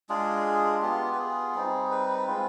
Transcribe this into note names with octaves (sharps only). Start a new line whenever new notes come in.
G#3 D4 F4 G#4
B3 F4 G4
B4
G#4
G3 C4 D#4
B4
G#3 C4 F4